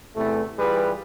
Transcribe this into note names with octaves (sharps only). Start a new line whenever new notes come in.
E2 C3 E3 A3
E3 G3 F4 G#4 B4